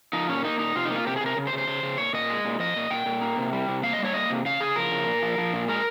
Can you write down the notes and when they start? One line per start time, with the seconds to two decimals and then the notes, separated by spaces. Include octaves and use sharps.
0.13 F3 D#4
0.29 A#2 C#4
0.44 A#3 D#4
0.59 A#2 D#4
0.75 C3 F4
0.85 D#4
0.90 A#3
0.96 F4
1.07 C3 G4
1.16 G#4
1.21 C3
1.26 A#4
1.37 C#3
1.47 C5
1.53 C#3
1.58 C5
1.67 C#3
1.83 C#3
1.98 A#2 C#5
2.13 A#2 D#5
2.30 G#3
2.45 A#2
2.60 F3 D#5
2.76 A#2
2.90 A#2 G5
3.06 A#2
3.21 A#3
3.38 C3
3.53 G3
3.68 C3
3.83 A#3 F5
3.93 D#5
3.99 G3
4.04 C#5
4.14 A#3 D#5
4.30 C3
4.45 C#3 F5
4.60 C#3 G#4
4.76 F3 A#4
4.92 C#3
5.07 A#2
5.22 F3
5.38 F3
5.53 A#2
5.68 G#3 A#4